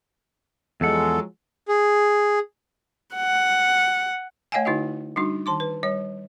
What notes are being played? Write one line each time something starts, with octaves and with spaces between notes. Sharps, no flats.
E2 F3 F#3 G#3 A4 F#5
G#4
F#5
A3 C#5 D#5 F5 G5 G#5
D3 D#4 E4 F#4 D#5
G3 D4 D#4 F#4
D#3 A5 C6 D6
B4
G3 C#5